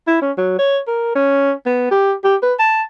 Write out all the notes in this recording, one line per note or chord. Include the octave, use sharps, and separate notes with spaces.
E4
C#4
F#3
C#5
A#4
C#4
B3
G4
G4
B4
A5